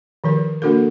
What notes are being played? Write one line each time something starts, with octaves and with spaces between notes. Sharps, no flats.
D#3 F3 A#4
A#3 D4 F#4 A4 A#4